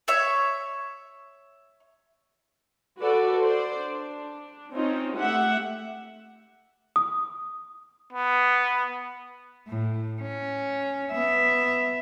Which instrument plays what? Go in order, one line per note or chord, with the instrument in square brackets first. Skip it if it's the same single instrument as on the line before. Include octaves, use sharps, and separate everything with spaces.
[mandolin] C#5 E5 C#6
[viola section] F#4 A4 B4 D5
C5 D5
D4
C4 C#4 D#4 F4
A3 G4 E5 F#5
[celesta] D#6
[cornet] B3
[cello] A2
C#4
B3 E5